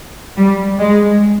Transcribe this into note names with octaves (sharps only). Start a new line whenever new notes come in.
G3
G#3